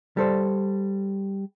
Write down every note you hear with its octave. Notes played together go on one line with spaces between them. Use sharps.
G3 A4 C5